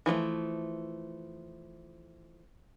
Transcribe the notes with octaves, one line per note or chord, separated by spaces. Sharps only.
E3 F3 G3 A3